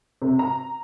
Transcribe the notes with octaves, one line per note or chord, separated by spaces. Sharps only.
C3
A#5